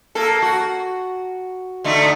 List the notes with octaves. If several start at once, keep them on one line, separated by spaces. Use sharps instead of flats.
A#3 A4
F#4
D3 A3 D#4